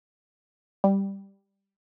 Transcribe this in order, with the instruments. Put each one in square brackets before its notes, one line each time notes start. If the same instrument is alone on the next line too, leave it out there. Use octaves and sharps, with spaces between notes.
[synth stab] G3